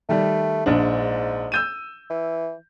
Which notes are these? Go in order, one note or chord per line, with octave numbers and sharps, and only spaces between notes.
D#3 G3 A3
A#1 G#2 D4
E6 G6 D#7
E3